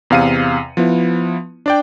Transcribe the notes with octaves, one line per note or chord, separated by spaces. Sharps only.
E2 C3 F5 C#7 D#7
F3 B3 E4
D4 D5 G5